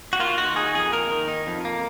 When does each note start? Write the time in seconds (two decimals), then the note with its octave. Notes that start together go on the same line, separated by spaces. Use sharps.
0.13 F#4
0.19 A#3 F4
0.38 D#3 F#4
0.56 D#4 G#4
0.75 F2 G#4
0.92 A#3 A#4
1.11 D#3
1.28 D#4
1.47 F2
1.65 A#3